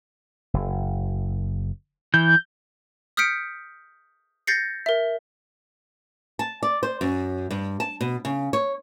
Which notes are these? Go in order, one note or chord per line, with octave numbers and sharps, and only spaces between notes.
F#1
E3 G6
D#6 F6 G6 B6 C#7 D7
G6 A6 A#6 C7 C#7
A#4 E5
A5
D5
C5
F#2
G2
A5
B2
C#3
C#5